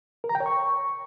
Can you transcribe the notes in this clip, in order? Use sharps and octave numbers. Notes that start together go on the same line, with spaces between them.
A#4
A#5
G5
C#5
C#6